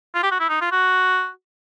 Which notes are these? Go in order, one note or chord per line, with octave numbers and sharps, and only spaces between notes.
F4
G4
F#4
E4
D#4
F4
F#4